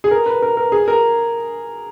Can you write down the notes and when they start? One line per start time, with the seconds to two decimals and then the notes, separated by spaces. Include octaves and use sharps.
0.04 G#4
0.11 A#4
0.26 B4
0.42 A#4
0.57 A#4
0.72 G#4
0.88 A#4